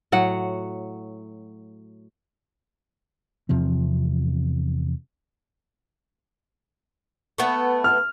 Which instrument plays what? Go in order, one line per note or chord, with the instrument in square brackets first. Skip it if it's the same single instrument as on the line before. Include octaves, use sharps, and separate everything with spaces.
[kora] A2 F#3 F#5
[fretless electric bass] E2 C3 F3 C4
[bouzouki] A3 B3
[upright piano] F6